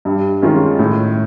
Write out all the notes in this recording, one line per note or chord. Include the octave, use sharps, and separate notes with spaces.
G2
D#3 G#3 C#4 F4
A2